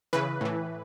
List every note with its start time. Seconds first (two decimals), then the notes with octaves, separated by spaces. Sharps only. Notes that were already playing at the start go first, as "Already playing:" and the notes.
0.13 C#3 E3 B4
0.41 A2 E3